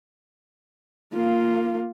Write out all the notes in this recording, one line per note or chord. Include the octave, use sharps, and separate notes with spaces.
A#3 F4